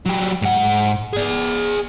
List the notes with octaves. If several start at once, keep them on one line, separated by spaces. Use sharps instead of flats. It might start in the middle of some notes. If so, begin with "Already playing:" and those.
F#3 G4
G#2 F#5
G#4 D5